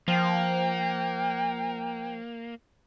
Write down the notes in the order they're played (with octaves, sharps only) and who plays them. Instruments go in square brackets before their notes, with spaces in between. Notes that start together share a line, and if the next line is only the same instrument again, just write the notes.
[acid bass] F3 [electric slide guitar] A#3 [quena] G5